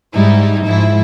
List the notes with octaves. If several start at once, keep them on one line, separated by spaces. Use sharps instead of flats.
G#2 G3 D#4 E4
G#2 F3 E4